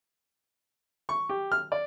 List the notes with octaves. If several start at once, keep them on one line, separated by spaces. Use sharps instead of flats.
C#6
G4
F6
D5